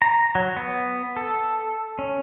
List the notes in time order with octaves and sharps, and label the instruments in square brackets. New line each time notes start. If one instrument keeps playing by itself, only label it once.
[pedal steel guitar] A#5
F#3
B3
A4
C#4